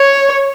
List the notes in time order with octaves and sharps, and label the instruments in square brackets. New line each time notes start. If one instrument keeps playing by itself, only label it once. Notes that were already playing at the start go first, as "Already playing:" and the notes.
Already playing: [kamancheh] C#5